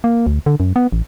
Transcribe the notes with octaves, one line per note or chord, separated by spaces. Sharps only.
A#3
D2
D3
F#2
B3
A1